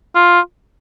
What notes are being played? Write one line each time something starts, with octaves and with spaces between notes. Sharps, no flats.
F4